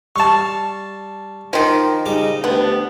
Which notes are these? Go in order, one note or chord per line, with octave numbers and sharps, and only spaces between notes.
G3 F5 A5 C#6
D#3 F3 D#4 F#4 A#4
C#3 G3 D#4 D#5 D6
D2 B3 D4 G4